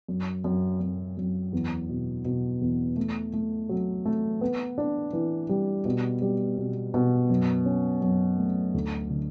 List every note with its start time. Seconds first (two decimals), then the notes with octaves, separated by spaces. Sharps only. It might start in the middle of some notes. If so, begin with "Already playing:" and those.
0.08 F#2
0.44 F#2
0.80 F#2
1.17 F#2
1.53 E2
1.89 B2
2.25 B2
2.61 E2
2.97 A3
3.33 A3
3.69 F#3
4.05 A3
4.41 B3
4.78 D4
5.13 E3
5.49 G3
5.85 B2
6.22 G3
6.58 B2
6.94 B2
7.30 F#2
7.66 C#4
8.02 F#2
8.38 A3
8.74 D2
9.10 D3